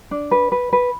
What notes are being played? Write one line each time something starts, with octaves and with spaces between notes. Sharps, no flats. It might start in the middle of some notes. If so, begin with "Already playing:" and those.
D4
B4
B4
B4